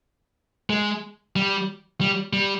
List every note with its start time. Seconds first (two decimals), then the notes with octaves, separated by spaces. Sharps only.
0.70 G#3
1.36 G3
2.01 G3
2.33 G3